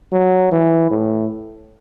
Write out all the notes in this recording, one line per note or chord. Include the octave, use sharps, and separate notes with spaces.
F#3
E3
A2